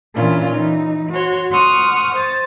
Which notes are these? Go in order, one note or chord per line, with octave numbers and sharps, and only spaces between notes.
A#2 E3 C#4 D4 F4
E3 D#4
F#4 C#5 C6
F#5 C6 C#6 D#6 F6
C5 A6